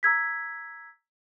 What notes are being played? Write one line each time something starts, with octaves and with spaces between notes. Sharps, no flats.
A#5 E6 G#6 B6